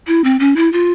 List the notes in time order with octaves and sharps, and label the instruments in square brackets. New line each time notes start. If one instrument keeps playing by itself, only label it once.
[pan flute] E4
C4
C#4
E4
F4